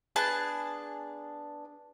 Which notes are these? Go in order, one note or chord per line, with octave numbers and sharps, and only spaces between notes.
B3 D4 G#4 A5